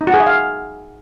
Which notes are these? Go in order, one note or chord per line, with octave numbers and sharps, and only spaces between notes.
D#4
F#4
G#4
E5
F5